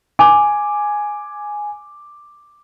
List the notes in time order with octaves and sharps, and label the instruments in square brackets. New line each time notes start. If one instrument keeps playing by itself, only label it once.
[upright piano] G#5 D6